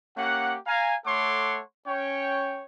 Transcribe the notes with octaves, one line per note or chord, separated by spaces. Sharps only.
A#3 C#4 G4 F#5
F5 G#5 A#5
A3 A4 C#5 F#5 C6 D6
C#4 C#5 G5